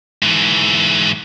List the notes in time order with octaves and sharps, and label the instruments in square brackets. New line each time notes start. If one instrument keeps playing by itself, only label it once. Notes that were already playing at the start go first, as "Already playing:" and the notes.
[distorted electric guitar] G#2 E3